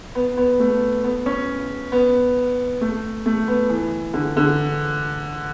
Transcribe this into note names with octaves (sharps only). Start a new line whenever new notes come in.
B3
B3
A3
B3
C#4
B3
A3
A3
B3
E3
D3
D3